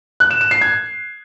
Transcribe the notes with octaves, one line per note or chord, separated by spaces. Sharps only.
F#6
E7
E7
C7
G#6